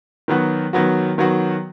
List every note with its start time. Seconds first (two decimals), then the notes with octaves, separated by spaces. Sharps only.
0.28 D#3 F#3 B3 F#4
0.73 D#3 F#3 B3 F#4
1.18 D#3 F#3 B3 F#4